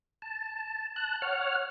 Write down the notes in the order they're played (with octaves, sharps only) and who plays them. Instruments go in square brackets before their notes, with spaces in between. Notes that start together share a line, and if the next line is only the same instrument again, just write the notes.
[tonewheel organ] A5
A5 F#6
C#5 F#5 F6